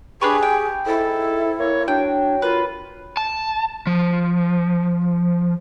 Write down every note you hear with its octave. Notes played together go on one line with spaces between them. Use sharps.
D4 G4 G#4 B4 C#5
G5
G#2 E4 A4
A#3 C#5
F#3 D4 G5
F4 A#4 B4
A5
F3